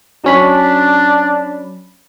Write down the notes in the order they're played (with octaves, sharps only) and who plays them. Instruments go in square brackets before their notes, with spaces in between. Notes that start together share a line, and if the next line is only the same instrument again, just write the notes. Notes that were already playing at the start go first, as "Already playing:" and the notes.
[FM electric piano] F#3 C#4 B5 [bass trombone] D4